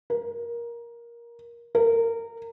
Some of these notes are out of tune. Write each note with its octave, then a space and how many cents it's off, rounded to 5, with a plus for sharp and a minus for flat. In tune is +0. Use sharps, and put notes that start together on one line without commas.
A#4 +15
A#4 -25